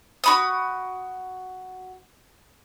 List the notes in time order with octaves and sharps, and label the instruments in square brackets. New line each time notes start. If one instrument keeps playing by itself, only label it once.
[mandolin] F#4 B5 D#6